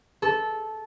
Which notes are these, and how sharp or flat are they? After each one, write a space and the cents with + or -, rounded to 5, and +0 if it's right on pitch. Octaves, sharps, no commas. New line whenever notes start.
A4 -15